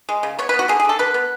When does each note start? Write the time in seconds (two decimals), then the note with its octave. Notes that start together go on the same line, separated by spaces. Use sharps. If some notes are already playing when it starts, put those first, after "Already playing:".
0.09 G#3
0.23 C#3
0.39 B3 C#5
0.49 B3 B4
0.59 F#4
0.68 D3 G#4
0.80 G#4
0.85 D3 A4
0.99 D3 B4
1.14 B3